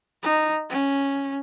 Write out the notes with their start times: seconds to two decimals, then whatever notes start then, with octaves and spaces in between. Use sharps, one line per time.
0.23 D#4
0.70 C#4